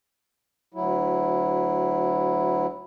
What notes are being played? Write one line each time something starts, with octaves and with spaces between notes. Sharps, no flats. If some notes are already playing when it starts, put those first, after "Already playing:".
D2 F#3 E4